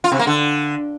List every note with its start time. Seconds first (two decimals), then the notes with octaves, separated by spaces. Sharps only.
0.04 F4
0.12 C3
0.19 A#3
0.27 D3